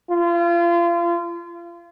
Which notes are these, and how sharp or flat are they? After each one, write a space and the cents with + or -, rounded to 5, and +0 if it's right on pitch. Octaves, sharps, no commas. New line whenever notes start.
F4 -35